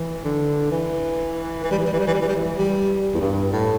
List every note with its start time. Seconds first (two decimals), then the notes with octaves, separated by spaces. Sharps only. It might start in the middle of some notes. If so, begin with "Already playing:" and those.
Already playing: E3
0.24 D3
0.71 E3
1.64 E3
1.71 G3
1.79 E3
1.86 G3
1.93 E3
1.99 G3
2.08 E3
2.14 G3
2.22 E3
2.28 G3
2.36 E3
2.59 G3
3.14 E2
3.20 G2
3.52 A2